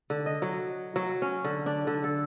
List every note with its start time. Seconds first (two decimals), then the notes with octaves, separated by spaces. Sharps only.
0.10 D3
0.26 D#5
0.42 F#3
0.96 F#3
1.22 C#4
1.45 D3
1.66 D4
1.87 D3
2.04 A4